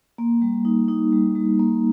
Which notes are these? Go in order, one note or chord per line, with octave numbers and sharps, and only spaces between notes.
A#3
G3
D#4
D#4
G3
G3
A#3